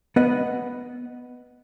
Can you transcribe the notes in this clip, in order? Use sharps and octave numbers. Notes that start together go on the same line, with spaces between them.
B3 B4 D#5 F#5